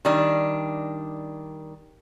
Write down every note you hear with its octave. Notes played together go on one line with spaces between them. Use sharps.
D#3 G3 D4